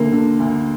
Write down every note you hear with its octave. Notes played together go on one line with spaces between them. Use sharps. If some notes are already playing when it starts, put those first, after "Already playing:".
Already playing: D2 D3 A#3
D3
D2